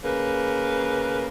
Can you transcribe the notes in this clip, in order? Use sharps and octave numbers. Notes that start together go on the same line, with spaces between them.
C#3 A#3 B4